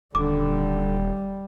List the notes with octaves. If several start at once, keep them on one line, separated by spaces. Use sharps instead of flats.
D#1 D3 G3 D6